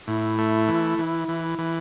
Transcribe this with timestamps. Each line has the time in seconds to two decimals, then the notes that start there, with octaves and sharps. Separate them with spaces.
0.07 A2 E4
0.38 A3
0.68 E3
0.99 E3
1.28 E3
1.59 E3